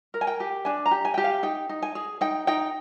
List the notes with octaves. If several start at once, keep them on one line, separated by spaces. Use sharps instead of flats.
A#4
G#5
G5
G4
D4 G#5
A#5
G4
G#5
G4 G5
F5
D#4 G5
D#4
G#5
G#4
D#4 G5
D#4 G5